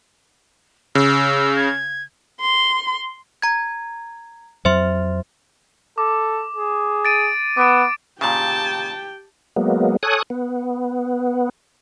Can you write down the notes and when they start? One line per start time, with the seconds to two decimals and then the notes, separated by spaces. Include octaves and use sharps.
0.95 C#3 E6
1.56 G#6
2.40 C6
3.42 A#5 G#6
4.65 F2 F#3 C5 E5 C6
5.98 A4 D6
6.56 G#4
7.05 A6 D7 D#7
7.57 B3 D6 D7
8.21 A#2 C#3 G4 G5 A5
9.56 F#3 G#3 A#3 B3
10.03 A4 C#5 G#5 D#6 F#6
10.30 B3